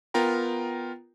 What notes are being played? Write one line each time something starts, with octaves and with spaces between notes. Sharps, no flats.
B3 F4 A#4 G5 A#5